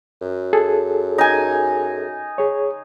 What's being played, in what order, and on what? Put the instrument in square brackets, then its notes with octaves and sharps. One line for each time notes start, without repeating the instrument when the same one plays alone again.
[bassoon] F#2
[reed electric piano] G#4 A4
[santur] D#4 G#5
[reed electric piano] G#4 C#5